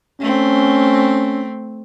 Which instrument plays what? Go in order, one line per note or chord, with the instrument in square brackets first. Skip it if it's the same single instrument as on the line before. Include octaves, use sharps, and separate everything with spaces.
[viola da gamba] A3 C4 [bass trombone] C#4